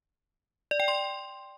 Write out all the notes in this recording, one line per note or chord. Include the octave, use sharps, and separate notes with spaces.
D5
G5
C6